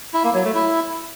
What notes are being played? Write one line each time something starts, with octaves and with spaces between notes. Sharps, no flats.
E4
A#3
F#3
A3
E4